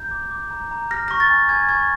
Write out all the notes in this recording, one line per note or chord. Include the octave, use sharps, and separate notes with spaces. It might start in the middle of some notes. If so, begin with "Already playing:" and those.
Already playing: A#5 G6
D6
D6
A#5
A#5
F6 A#6
C#6 A#6
A6
G#5
G#5 G#6
C#6 G#6